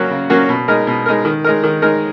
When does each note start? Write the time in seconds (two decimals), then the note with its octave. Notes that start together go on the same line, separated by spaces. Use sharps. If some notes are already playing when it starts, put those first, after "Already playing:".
Already playing: C#3 F#3 A#3 C#4 F#4
0.10 C#3
0.30 F#3 A#3 C#4 F#4
0.49 B2
0.68 G#3 D#4 A#4
0.87 B2
1.06 G#3 D#4 A#4
1.25 D#3
1.44 G#3 D#4 A#4
1.64 D#3
1.82 G#3 D#4 A#4